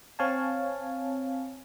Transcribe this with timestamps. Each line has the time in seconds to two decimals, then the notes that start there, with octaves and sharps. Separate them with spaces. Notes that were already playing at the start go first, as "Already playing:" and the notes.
0.19 C4 C#5 F5 G#5 A5